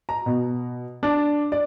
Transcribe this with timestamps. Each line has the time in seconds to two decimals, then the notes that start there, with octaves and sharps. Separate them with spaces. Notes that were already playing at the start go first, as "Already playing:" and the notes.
0.09 A#5
0.26 B2
1.03 D4
1.52 D5